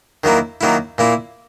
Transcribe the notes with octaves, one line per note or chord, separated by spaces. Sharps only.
D#3 F#3 A#3 E4
D#3 F#3 A#3 E4
A#2 A#3 E4